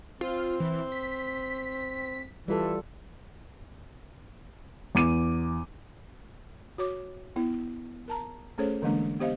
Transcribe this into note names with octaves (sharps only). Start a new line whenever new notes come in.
C4 F4
E3
B6
E3 G3 F4 A4
E2 D6 D#7
F#4 C#5 D6
B3 E4
A#4 A5 A#5
A3 C#4 G#4 A4 C5 C#5
D3 E3 G#3 A#3 D4
B3 G4 C5 D#5 F5